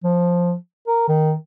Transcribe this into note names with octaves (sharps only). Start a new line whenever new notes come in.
F3
A#4
D#3